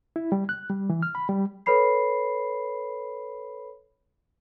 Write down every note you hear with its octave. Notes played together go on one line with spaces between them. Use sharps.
E4
G3
F#6
G3
E3
F6
B5
G3
A4 B4 C#5 B5 C7